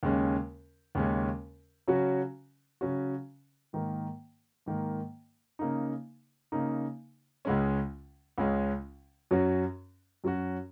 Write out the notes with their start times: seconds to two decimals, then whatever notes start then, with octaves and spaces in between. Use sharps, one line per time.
0.03 D#2 C#3 G#3 C#4
0.95 D#2 C#3 G#3 C#4
1.88 C#3 F#3 C#4 F#4
2.81 C#3 F#3 C#4 F#4
3.73 G#2 D#3 A#3
4.66 G#2 D#3 A#3
5.59 C#3 A#3 D#4
6.52 C#3 A#3 D#4
7.45 C#2 C#3 G#3 C#4
8.38 C#2 C#3 G#3 C#4
9.31 F#2 F#3 C#4 F#4
10.24 F#2 F#3 C#4 F#4